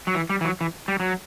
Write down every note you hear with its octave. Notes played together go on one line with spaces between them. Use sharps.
F#3
E3
G3
E3
F#3
E3
G3
F#3